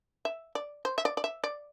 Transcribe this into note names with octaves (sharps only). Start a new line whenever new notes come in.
E5
D5
C5
E5
D5
D5
E5
D5